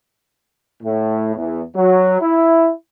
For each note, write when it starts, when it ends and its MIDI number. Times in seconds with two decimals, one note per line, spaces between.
0.83 1.35 45
1.36 1.61 40
1.75 2.18 54
2.20 2.70 64